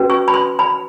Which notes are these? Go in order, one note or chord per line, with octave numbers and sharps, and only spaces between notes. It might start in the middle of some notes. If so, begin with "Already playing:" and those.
Already playing: C#4 F#4 B4
C#6
B5
C6
B5